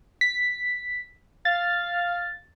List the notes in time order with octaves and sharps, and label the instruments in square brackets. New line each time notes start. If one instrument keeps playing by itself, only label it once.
[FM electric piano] B6
[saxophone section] F5 [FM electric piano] A6